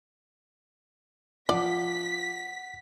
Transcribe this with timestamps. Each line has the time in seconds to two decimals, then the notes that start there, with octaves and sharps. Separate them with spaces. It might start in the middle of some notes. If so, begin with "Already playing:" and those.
1.49 F3 D5 F#5 B6